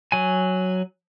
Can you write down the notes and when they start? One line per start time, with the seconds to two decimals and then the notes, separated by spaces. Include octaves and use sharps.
0.12 F#3 G#5